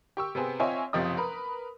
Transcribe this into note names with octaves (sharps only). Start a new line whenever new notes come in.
G4 C#6 E6
C3 B3 C4 G#4
C4 F4 C#5 D#5 E5 G#5
F#1 C3 F3 G4 D#5 D#6
A#4 B4 B5